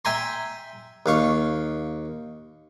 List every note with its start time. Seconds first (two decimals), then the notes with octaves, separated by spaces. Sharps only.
0.05 E5 G5 G#5 A#5 C6
1.06 D#2 F5 C#6